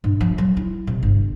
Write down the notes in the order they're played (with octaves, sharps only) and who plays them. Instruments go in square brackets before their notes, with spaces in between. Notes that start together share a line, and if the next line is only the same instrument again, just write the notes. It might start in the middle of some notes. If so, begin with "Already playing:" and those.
[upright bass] G2
F3
F#3
E4
C3
G1